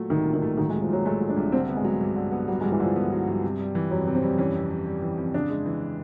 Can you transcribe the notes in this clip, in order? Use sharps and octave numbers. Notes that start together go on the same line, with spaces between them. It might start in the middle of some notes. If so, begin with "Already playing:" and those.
Already playing: A#2 F#3 A3
C2 D#3
A#2
D#3
A3
D#3 F#3
G#3
C2
F3
A#2 F#3
G#3 A3
F#3
D4
C2
D3 C4
B3
G#3
F#3
G2
D3
B3
F#3 G3
G#3
G2
E3
D3 F3
B3
F#3
G2
C3
G3
E3
F2 F#3
C3
C4
G3
E3 C#4
F2
C3
G3
E3
F2
C#3 D4
G#3
E3